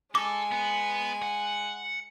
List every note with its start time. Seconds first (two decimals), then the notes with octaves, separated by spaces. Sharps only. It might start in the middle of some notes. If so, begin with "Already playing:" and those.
0.15 G#3 A4 G#5 D6
0.52 B3
1.23 F#5